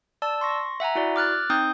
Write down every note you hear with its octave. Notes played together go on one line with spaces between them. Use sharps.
D5 A5 E6
C6 C#6 A#6
E5 F#5 G#5 A#5
E4 F#4 D5
D6 F6 F#6 A6
C4 D#4 G5 D#6 G6